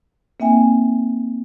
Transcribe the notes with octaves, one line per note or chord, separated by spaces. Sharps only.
A#3 C4 D#4 E5 G5 G#5